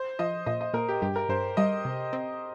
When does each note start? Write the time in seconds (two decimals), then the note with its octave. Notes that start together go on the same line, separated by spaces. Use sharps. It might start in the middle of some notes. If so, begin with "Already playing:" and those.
Already playing: C5
0.19 F3 D#5
0.46 A#2 D#5
0.61 D#5
0.74 A#2 A#4
0.89 G4
1.02 G2 G4
1.16 A#4
1.29 G2 C5
1.57 G3 D#5
1.85 C3
2.13 C4